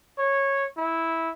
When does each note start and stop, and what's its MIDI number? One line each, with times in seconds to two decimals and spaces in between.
0.18 0.65 73
0.78 1.30 64